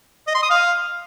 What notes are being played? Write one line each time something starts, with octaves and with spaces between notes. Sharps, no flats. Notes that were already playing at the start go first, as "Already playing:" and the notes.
D#5
C6
D#6
F5